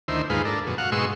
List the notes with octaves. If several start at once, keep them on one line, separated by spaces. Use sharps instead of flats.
D2 D#3 E4 C5
D#2 G#2 G#3 F4 B4
D4 A4 A#4
F#2 B2
F#4 F5 F#5
G#2 B2 G#3 C6 C#6 E6